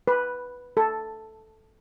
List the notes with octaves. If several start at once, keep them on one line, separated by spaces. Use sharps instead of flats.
B4
A4